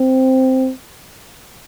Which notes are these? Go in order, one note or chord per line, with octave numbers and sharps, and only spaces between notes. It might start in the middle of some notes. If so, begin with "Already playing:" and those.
Already playing: C4